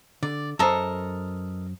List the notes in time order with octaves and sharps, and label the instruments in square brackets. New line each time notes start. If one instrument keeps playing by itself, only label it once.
[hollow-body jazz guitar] D3 [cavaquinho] D5
[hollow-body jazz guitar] F#2 C5 [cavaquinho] A4 A#4 D#5